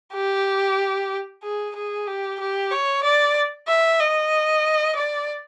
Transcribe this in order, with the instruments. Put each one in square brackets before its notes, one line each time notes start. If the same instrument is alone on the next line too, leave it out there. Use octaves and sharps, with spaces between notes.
[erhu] G4
G#4
G#4
G4
G4
C#5
D5
E5
D#5
D5